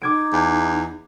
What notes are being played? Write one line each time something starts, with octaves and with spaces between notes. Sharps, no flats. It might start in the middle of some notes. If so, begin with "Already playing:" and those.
D#4 D6 G#6 D7
E2